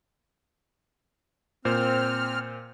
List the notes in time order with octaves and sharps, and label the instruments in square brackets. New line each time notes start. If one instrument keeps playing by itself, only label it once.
[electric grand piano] A#2 C5 [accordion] C4 F6